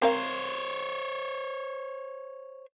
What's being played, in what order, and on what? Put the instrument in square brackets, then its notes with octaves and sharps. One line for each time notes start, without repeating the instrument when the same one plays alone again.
[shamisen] C4 A#4 F5 [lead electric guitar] C5 C#5